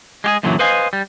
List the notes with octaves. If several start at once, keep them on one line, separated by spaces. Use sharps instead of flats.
G#3 G4 G#4
F#2 A#2 D3 E3 F#3
B4 C5 D#5 F5 G#5
G3